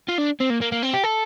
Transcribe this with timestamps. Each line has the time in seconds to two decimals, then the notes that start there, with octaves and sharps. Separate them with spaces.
0.09 F4
0.18 D4
0.40 C4
0.50 A#3
0.61 A#3
0.72 A#3
0.83 C4
0.94 G4
1.04 A4